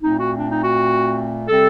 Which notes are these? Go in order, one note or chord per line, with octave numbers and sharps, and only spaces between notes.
A#2 A3 C4 D#4
F#4
D4
D#4
F#4
C3 G3 C4 A4